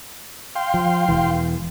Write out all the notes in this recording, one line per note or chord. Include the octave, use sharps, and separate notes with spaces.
F5 G5 C6
F3
E1 E3